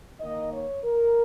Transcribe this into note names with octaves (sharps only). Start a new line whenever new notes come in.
D#3 A#3 D#4 D#5
C#5
A#4